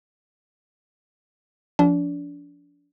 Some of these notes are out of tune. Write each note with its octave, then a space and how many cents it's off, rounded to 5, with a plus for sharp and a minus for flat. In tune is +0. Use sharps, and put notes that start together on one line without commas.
F3 +0 D4 -30